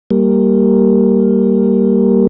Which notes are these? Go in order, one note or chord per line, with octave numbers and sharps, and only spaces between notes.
G3 A#3